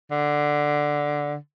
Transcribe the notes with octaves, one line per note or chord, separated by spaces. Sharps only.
D3